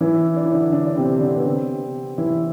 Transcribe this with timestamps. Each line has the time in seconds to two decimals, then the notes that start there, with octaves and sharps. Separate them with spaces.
0.01 E3 E4
0.36 D4
0.45 E4
0.53 D3 D4
0.72 D3 D4
0.86 D4
0.97 C3 C4
1.21 D3 D4
1.36 B3
1.45 C3 C4
2.18 E3 E4